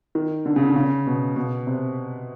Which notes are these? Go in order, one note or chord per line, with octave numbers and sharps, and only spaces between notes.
D#3
D3
C#3
D3
C#3
B2
B2
C3